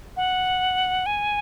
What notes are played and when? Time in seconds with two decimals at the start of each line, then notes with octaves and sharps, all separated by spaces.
0.17 F#5
1.06 G#5